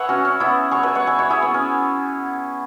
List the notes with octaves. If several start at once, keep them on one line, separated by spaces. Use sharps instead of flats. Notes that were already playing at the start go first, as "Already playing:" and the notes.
Already playing: G#4 B4 C#5 E5 F#5
C#4 F#4
C#4
B3 E4
G#4 C#5
B4 E5
C#5 F#5
E5 G#5
C#5 F#5
E4 G#4
B3
C#4